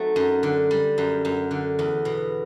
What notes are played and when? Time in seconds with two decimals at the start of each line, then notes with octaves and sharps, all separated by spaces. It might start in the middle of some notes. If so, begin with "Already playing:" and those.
Already playing: F#3 A3 C4 D#4
0.16 F#2
0.43 D3
0.71 G3
0.98 F#2
1.25 F#2
1.51 D3
1.79 E2
2.05 B2